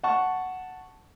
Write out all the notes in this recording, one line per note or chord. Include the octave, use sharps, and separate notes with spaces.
F#5 A5 C#6